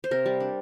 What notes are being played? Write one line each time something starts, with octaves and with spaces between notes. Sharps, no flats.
C5
C3 A#4
G3
D4